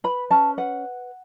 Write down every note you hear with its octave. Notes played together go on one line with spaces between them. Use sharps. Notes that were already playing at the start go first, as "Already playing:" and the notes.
B4 B5
C#4 A5
B4 F#5